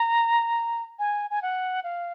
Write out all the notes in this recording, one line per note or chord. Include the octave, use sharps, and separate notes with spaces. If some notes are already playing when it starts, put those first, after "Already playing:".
Already playing: A#5
G#5
G#5
F#5
F5